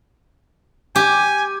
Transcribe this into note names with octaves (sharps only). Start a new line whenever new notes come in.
G4 G#5